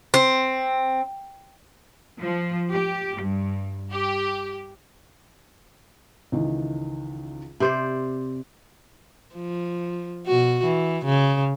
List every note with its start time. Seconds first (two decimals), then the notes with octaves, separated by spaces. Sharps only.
0.14 C4
2.21 F3
2.72 G4
3.20 G2
3.92 G4
6.32 C#2 D#3 E3
7.60 C3 G4 C5 D5
9.36 F3
10.27 B2 F#4
10.64 E3
11.05 C#3